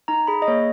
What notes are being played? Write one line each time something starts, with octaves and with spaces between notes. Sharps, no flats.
D#4 A#5
G#4 B5
D#5
A#3 C#5